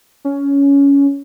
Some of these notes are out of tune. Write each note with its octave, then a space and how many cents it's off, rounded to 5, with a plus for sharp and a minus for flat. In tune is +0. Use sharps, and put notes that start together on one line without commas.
C#4 +15